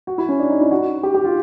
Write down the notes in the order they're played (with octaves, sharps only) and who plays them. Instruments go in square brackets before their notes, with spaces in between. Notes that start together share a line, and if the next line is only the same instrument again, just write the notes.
[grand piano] F#4
E4
C#4
D4
D#4
E4
F#4
G4
G4
F4